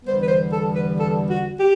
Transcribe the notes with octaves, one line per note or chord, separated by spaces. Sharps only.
E2 D3 G3 B3 C5
B4
C5
A4
B4
A4
F#4
G4